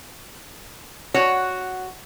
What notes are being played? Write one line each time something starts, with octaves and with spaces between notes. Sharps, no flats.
F#4 C#5